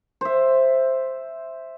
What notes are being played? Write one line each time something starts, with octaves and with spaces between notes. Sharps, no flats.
C5 E5